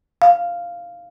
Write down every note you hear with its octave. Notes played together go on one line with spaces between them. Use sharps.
F5